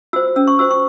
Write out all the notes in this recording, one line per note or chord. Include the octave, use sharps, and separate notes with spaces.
F#4 C5 E6
C#4 E6
C#6
F#4 C5 E6
C#6